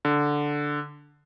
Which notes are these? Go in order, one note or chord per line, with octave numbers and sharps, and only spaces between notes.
D3